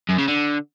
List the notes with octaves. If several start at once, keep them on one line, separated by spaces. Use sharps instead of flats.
F#2
C#3
D3